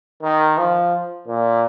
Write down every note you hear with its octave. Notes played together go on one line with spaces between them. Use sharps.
D#3
F3
A#2